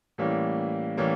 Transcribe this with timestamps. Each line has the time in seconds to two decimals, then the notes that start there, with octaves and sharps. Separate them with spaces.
0.18 A2 E3 G3 A#3 C#4
0.97 A2 E3 G3 A#3 C#4